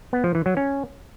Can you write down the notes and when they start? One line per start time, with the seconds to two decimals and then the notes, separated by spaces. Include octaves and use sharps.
0.13 B3
0.24 F3
0.35 E3
0.46 F#3
0.57 C#4